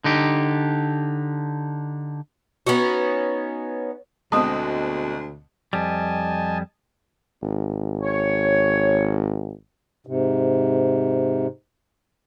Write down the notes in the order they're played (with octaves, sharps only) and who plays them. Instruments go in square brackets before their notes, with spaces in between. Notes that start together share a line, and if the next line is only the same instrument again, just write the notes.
[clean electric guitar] D3 D#4 G4
[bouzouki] B3 C#4 D#4 F#4
[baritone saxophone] D2 [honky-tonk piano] B2 G#3 C4 [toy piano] A5 D#6
[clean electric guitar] F2 G3 [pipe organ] D#5 G#5 A5
[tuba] G#1
[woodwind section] C#5
[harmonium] G#2 C3